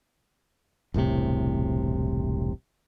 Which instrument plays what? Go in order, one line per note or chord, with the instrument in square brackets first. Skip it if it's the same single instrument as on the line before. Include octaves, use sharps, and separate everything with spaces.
[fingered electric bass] E1 C2 A2 C3